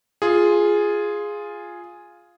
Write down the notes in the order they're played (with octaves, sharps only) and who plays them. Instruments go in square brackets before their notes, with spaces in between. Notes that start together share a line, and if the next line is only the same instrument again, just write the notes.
[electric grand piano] F4 G#4